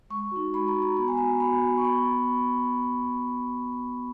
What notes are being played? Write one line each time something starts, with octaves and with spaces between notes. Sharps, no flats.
G#3 C#6
D#4 F#4
G#3 B5
A#5
D#4 F#4
A#5
B3 A#5
G#5
F#4 A#5
B3 B5
F#4
C#6
B3 B5